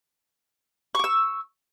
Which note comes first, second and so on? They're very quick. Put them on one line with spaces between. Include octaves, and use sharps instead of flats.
C#6 D6 E6